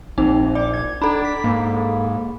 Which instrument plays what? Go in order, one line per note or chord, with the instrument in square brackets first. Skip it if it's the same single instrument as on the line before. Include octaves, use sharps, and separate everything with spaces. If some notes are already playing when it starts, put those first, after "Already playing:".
[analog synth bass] A#1 [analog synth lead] C4 [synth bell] D#4
[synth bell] D5 [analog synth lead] D6
[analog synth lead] G#6
[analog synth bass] D4 [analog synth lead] D#4 [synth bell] A4 B5
[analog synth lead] B6
[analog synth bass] G#2 [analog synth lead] A#3